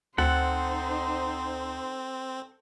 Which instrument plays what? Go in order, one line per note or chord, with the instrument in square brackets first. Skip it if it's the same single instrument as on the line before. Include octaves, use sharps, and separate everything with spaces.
[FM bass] D2 [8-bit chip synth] C4 [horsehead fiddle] D#4 C5 [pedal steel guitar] A4 F#5